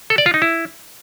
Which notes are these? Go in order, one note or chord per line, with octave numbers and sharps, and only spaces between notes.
A4
D5
F4
D#4
E4